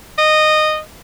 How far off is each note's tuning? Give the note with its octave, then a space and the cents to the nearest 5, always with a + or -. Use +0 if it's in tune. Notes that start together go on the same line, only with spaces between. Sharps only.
D#5 -15